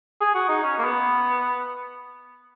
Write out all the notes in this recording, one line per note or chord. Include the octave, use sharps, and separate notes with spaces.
G#4
F#4
D#4
C#4
A#3
B3